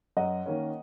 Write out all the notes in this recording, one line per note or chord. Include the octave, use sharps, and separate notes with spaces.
F#2 D#5 F#5
D#3 A#3 C#4